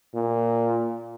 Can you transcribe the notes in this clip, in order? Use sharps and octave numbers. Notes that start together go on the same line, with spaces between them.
A#2